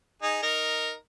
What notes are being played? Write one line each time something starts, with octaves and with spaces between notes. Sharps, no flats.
D#4 G#4
D#4 A#4